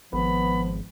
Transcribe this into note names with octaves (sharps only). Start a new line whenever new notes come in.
G#1 F3 B3 B5